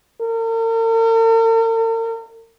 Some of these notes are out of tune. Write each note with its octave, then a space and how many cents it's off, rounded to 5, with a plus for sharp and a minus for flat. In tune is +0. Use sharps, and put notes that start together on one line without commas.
A#4 -45